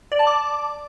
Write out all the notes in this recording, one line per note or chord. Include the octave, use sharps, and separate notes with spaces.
D5
A5
D6